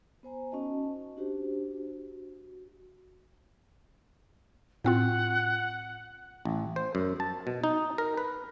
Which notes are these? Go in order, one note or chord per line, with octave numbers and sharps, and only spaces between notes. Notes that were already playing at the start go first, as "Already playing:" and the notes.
B3 C5 G#5 A#5
C#4 D#4 F#4 D#5 A5
D4 F#4 G4 C5
F#4
A2 C4 F4 F#5
A1
C5
F#2
A5
B2
D#4
A#4
B4